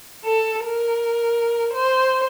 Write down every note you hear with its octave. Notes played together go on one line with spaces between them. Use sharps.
A4
A#4
C5